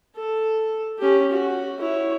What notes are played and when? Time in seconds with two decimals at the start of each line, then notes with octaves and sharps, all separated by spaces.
0.16 A4
0.98 C#4 G4
1.31 F#4
1.79 E4 C#5